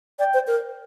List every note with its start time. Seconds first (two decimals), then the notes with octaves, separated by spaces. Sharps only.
0.19 D5 G5
0.34 C5
0.47 A#4